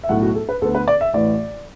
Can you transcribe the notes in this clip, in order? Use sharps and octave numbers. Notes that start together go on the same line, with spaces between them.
E5
B1 A2 F#3 A3 F#5
F#4
A4
B4
D2 D3 B3 A4
B4
D5
E5
A1 A2 E3 D5